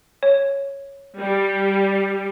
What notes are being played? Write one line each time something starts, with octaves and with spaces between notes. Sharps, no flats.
C#5
G3